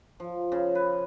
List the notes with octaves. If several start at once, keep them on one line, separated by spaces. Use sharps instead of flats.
F3
C#3
B4